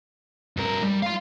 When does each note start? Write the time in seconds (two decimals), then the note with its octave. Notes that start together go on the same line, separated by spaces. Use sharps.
0.57 G2 A#4
0.83 G3
1.03 F5 C6